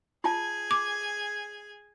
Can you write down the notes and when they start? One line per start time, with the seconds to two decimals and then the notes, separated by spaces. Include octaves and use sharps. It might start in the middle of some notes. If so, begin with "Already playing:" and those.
0.24 F4 G#4 G#5 A5
0.71 D6